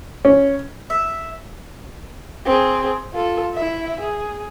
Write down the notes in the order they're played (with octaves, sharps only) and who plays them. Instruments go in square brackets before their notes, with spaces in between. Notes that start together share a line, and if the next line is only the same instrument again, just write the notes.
[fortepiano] C#4
[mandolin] E5
[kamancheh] C4 G#4
F4 A4
E4 E5
G#4